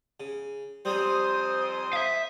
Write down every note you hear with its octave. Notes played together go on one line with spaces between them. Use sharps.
C#3
F2 G3 C4 C#4 C5 D#6
E5 F5